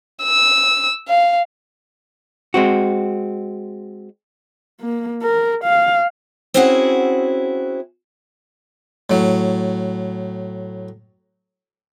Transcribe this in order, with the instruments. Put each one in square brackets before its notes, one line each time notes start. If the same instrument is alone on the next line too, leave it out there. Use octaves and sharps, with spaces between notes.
[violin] E6
F5
[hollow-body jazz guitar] G#3 C4 F#4
[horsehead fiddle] A#3
A#4
F5
[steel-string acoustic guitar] C4 C#4 E4 F#4 G#4 F#5
[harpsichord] A2 F#3